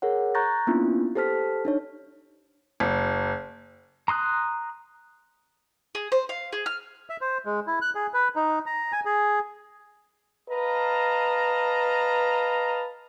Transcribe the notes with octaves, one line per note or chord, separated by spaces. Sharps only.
G#4 A#4 C#5 F#5
A#5 C#6 F#6 G6 A6 A#6
A#3 B3 C#4 D4 E4 F4
G4 A4 C5 A5 F6 B6
D4 D#4 C#5
F#1
A#5 C6 D#6 F#6
G#4
C5
F5
G#4
F6
E5
C5
G#3
E4
F#6
G#4
B4
D#4
A#5
G#5
G#4
B4 D#5 F5 A5 A#5